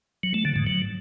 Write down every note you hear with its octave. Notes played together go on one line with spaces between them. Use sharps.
F#3
A3
D3
G#2
F#3